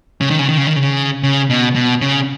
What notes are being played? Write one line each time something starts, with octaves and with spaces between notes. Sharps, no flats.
C#3
D#3
C#3
D#3
C#3
D#3
C#3
C#3
B2
B2
C#3